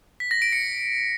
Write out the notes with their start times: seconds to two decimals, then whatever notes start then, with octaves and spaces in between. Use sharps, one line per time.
0.20 B6
0.31 A#6
0.42 D7
0.52 C#7